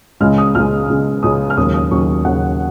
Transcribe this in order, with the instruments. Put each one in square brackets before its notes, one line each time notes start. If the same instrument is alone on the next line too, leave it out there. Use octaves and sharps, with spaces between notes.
[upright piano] C#2 C#3 G#3 F6
D#6
C#2 C#3 G#3 F6
C#2 C#3 G#3
C#2 C#3 G#3 D#6
F6
D#2 C#3 F#3 D#6
D#6
D#2 C#3 F#3 C#6
D#2 C#3 F#3 F#5